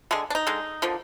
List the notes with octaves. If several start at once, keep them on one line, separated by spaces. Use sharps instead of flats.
D3 G#3 G#4
D4
D#4
D3 G#3
D3 F3 A#3